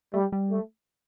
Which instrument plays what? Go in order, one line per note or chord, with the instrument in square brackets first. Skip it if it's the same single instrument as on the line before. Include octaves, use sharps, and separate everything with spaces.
[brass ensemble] G3 [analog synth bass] A3
[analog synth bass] G3
[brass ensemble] A3